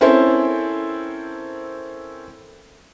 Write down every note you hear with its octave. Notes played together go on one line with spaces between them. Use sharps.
C4 C#4 E4 A4 A#4 C5